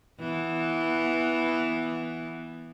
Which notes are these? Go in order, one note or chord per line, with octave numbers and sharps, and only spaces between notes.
E3 B3